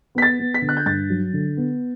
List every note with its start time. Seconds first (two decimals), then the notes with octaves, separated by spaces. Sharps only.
0.15 B3 B6
0.22 A6
0.39 B3
0.54 B6
0.62 D3
0.69 F#6
0.77 G6
0.86 G2 A6
1.10 F#3
1.33 D3
1.57 B3